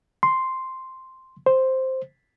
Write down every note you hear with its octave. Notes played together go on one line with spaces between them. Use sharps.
C6
C5